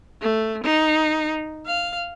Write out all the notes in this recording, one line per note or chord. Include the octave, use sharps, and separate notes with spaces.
A3
D#4
F5